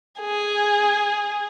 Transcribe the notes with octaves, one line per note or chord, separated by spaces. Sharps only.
G#4